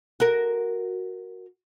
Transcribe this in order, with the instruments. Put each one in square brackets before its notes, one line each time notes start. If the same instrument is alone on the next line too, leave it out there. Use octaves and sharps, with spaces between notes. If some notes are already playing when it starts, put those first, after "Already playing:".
[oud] F#4 A#4